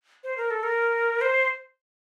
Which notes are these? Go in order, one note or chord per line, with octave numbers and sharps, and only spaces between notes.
C5
A#4
A4
A#4
C5